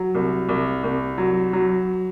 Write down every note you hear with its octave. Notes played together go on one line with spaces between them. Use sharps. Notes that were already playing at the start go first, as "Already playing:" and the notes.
Already playing: F#3
C2
C2
C2
F#3
F#3